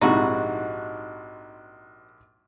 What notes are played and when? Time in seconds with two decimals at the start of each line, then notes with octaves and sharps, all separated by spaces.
0.01 A#1 G#2 C3 D#4 E4 F#4